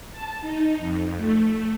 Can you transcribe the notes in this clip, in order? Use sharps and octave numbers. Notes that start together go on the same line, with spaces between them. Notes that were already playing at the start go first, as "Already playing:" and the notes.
A5
D#4
F2
A3